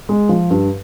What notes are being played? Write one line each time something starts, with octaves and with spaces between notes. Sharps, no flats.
G#3
F3
G2